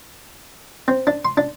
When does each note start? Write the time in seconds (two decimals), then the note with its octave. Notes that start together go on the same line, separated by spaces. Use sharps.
0.88 C4
1.07 D4
1.25 C6
1.37 D4